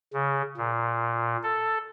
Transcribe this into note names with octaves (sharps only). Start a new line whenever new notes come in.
C#3
A#2
A4